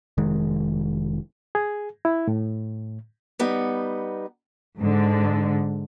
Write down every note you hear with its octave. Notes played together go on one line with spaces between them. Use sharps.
F1 D#3 G#3
G#4
E4
A2
G3 B3 D#4
G#2 D3